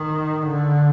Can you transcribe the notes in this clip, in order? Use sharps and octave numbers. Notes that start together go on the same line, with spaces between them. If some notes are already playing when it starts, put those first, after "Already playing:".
Already playing: D#3
D3